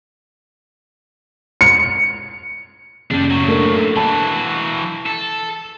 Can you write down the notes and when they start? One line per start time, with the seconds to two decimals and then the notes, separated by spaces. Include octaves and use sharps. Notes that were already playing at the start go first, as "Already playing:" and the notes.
1.61 C#7
3.11 F#1 G3 D4
3.30 A2 F#3
3.48 A3 A#3 D4
3.97 E3 F#4 A5
5.06 A4